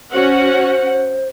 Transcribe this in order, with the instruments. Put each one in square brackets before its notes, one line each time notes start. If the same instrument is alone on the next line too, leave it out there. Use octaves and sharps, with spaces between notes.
[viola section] C#4 F#4 F#5 [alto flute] C5